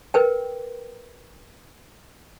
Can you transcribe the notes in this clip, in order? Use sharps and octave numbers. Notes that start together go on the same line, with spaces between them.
A#4 B4 G5